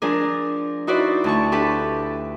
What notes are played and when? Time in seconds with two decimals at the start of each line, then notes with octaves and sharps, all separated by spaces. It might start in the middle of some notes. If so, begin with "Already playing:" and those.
0.02 F3 D4 G#4 A#4
0.87 D#4 E4 F#4 B4 C5 D5
1.24 D2 A5 C#6
1.52 D4 G4 A4 B4